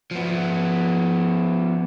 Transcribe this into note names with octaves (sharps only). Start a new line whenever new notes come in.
F3 B3